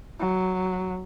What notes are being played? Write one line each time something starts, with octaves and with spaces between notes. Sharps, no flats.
F#3